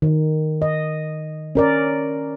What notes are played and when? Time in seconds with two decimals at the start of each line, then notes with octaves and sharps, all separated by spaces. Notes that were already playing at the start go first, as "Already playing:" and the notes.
0.02 D#3
0.62 D#5
1.55 C#4 A#4 D5